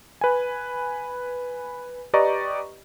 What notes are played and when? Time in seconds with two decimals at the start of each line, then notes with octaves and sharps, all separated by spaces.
0.21 B4 G#5
2.13 G4 B4 D5 D#5 A#5 C#6